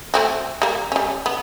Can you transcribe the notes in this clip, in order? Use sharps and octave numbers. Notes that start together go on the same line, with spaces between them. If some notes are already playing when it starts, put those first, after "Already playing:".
A3 C4 F#4
G3 A#3
G3 C#4
B3